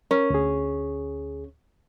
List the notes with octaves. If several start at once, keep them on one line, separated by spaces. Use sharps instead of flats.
C#4 A#4
D2 G#4